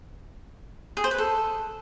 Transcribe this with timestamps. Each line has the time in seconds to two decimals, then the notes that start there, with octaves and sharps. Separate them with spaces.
0.97 G#4
1.04 C5
1.11 B4
1.18 A4